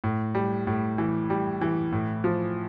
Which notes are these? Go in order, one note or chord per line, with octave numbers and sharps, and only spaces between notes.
A2
G3
A2
E3
G3
E3
A2
F3